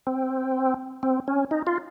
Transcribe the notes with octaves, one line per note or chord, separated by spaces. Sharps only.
C4
C4
C#4
D#4
F4